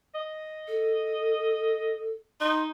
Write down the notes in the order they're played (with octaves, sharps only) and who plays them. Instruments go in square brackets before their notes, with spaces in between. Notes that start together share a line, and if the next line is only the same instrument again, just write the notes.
[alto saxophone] D#5
[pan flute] A4
[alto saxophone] D#4 [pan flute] C6